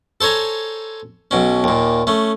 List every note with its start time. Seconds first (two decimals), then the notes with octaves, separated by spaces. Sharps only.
0.21 A4 C5 C#5 G#5 A#5
1.31 B1 B2 C#4
1.64 D#2 A#2
2.07 A3 C#4